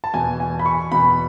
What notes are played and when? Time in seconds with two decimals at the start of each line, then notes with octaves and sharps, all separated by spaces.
0.04 A5
0.14 E2 B2 G#5
0.40 G#5
0.59 B5
0.66 C#6
0.92 E2 B2 B5